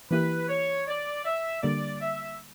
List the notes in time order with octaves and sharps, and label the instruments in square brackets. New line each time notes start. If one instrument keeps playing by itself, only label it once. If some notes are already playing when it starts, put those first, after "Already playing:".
[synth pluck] E3 A#3 E4 G4 [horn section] B4
[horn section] C#5
D5
E5
[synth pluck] D3 G3 A#3 [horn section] D5
[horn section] E5